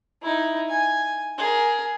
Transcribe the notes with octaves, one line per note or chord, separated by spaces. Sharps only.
D#4 E4
G#5
G#4 A#4